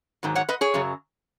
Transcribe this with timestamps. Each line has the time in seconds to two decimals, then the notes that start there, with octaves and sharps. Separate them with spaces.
0.23 G#2 D#3 F#3
0.35 C#5 F#5
0.49 B4 D#5
0.61 G#4 C#5
0.74 F#2 C#3 F#3